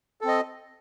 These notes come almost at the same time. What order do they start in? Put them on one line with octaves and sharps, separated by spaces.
A4 C4 D#5